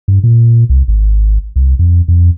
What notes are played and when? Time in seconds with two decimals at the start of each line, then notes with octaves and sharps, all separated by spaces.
0.08 G2
0.23 A#2
0.69 C2
0.88 G#1
1.56 C2
1.79 F2
2.08 F2